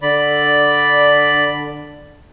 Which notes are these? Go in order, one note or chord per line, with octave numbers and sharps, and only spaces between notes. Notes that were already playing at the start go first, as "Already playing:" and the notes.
D3 D5 B5